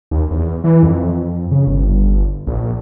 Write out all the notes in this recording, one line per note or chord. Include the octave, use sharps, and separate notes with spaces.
D#2
E2
E3
F2
C#3
G1
A#1